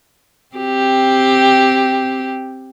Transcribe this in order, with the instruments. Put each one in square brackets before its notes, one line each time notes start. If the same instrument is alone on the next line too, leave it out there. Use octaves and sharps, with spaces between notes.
[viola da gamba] C4 G4